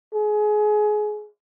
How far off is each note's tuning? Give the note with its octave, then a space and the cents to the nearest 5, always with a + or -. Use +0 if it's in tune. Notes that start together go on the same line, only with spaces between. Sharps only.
G#4 +25